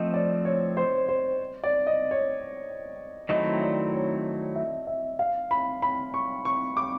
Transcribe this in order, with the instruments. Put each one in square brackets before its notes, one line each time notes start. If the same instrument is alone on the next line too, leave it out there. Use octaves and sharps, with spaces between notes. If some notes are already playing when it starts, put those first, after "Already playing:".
Already playing: [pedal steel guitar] F3 A3 C4 [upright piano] D#5
[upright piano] D5
C#5
C5
C5
D5
D#5
C#5
[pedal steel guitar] D#3 F#3 A3 C4 E4 [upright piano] D#5
[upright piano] D5
C#5
E5
E5
F5
B5
B5
C#6
C#6
D6